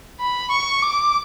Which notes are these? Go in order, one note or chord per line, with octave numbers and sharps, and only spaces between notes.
B5
C#6
D6